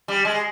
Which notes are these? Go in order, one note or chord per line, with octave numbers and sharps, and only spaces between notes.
G3
G#3